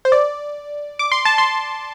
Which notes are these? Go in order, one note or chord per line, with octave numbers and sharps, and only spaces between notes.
C5
D5
D6
C6
A5
C6